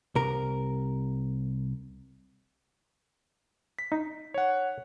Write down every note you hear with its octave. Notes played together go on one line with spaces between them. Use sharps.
C2 A#4
B6
D#4
C#5 F#5